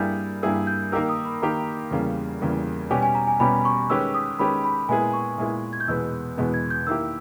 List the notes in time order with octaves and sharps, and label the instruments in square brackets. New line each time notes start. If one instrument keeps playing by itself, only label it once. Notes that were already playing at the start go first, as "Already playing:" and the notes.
Already playing: [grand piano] G2 G3 A#3 E4 G#4 [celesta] G6
[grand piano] G2 G3 A#3 E4 G#4 [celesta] E6
[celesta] G6
[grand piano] D#3 A#3 D#4 G4 A#4 [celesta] E6
[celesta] D#6
B5
[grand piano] D#3 A#3 D#4 G4 A#4 [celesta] A#5
[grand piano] E2 C#3 G3 A#3
E2 C#3 G3 A#3
[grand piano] B2 G3 C#4 G4 [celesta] G#5
[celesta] G#5
A#5
G#5
[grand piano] B2 G3 C#4 G4 [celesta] B5
[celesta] C#6
[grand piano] D#3 G#3 C#4 G4 B4 [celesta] E6
[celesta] D#6
[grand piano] D#3 G#3 C#4 G4 B4 [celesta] B5
[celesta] B5
[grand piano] A#2 G#3 B3 E4 G#4 [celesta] G#5
[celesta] C#6
[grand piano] A#2 G#3 B3 E4 G#4
[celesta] G#6
G6
[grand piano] E2 B2 G#3 B3 [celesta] E6
[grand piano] E2 B2 G#3 B3
[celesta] G#6
G6
[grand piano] D#3 A#3 E4 G4 [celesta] E6